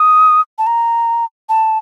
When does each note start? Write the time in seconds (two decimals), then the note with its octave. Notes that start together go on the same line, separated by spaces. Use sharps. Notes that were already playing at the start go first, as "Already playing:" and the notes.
Already playing: D#6
0.58 A5
0.67 A#5
1.49 A5